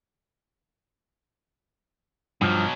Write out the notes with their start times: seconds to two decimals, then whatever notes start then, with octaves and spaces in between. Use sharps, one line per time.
2.42 G2 B2 F3 F#3